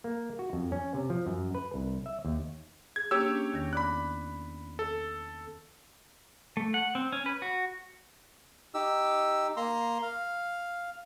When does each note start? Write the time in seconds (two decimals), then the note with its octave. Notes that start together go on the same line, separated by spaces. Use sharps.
0.04 A#3
0.39 F#4
0.53 F2
0.72 C#4
0.94 C3
1.10 F3
1.27 F#2
1.55 B4
1.74 C2
2.06 E5
2.25 D#2
2.96 G#4 G#6
3.11 A#3 C#4 D4 G4 C#5 E6
3.52 E2 D#3 A#6
3.73 B3 D5 B5 D6 F#6
4.79 A4
6.57 A3
6.74 F#5
6.95 C4
7.12 C#4
7.26 B4
7.42 F#4
8.74 D#4 G4 E6
9.57 A#3 A#5 C6
10.03 F5